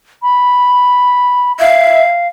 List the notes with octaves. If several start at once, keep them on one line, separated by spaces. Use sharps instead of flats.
B5
E5 F5